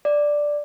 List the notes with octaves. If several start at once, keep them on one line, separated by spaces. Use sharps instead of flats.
D5